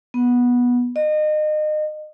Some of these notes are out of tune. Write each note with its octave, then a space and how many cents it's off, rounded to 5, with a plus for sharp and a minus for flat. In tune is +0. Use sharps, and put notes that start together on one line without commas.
B3 -15
D#5 -30